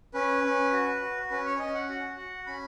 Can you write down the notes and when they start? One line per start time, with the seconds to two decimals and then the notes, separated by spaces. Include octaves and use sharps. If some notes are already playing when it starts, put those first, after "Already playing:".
0.14 C#4 B4
0.44 C#4
0.73 F#4
1.01 F#4
1.30 C#4 B4
1.45 C#5
1.59 C#4 D#5
1.75 F#5
1.89 F#4
2.17 F#4
2.47 C#4 B5